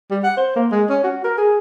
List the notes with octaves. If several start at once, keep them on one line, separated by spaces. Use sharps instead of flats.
G3
F#5
C5
A#3
G#3
C#4
F#4
A#4
G#4